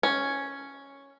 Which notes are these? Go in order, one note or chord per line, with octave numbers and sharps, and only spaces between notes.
C#4